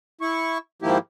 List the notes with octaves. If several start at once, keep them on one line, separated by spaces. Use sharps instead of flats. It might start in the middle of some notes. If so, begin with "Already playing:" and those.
E4 C#6
G#2 D#3 F3 A#3 E4 G4